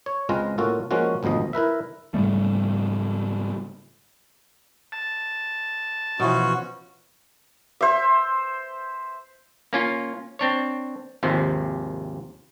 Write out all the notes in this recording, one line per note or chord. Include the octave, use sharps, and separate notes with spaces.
C#5
C#2 G#3 C4 F4 B4 A#5
A2 A#3 C#4 F4 F#4 A4
F3 G#3 A#3 C#4 F4 F#4
G#1 D2 B2 F3 D#5
E4 A#4 B4 E5
G#2 C#3 G3 A3
A5
B2 E3 F3 C#4 F#4
C5 E5
A#3 C#4 F4
C4 D4 C#5
G#1 D#2 C3 F3